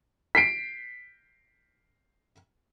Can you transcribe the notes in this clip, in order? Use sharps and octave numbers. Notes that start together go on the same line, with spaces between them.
B6 C7 D7